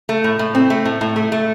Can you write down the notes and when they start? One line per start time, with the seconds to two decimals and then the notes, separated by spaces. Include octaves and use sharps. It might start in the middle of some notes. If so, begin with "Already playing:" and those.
0.09 A3
0.24 A2
0.39 A2
0.55 C4
0.70 A3
0.85 A2
1.01 A2
1.16 A3
1.32 A3